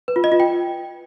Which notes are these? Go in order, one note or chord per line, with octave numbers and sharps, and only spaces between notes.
B4
F4
D#5
F4
G5